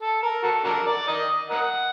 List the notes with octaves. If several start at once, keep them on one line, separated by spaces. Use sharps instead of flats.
A4
A#4
F#4 A4
D4 F#4 A#4
D5
A#4 D#5
A#4 D#5 F#5